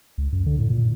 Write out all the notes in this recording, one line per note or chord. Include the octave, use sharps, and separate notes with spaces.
C#2
F#2
D3
A2
A#2